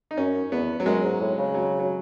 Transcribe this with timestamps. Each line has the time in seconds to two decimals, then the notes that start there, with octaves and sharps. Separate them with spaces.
0.11 D#4
0.17 F#2 C#4
0.51 E2 B3
0.80 F#3
0.86 F#2 G#3
1.04 G#2
1.20 A2
1.38 C#3
1.54 F#3
1.79 F#3